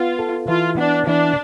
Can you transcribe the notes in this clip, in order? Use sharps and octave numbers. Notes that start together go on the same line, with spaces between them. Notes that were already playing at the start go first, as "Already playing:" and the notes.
Already playing: B3 F4
A4
E3 F4
B3 D4
E3 D4